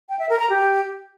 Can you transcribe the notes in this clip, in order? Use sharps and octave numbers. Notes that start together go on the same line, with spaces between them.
G5
E5
A#4
A#5
G4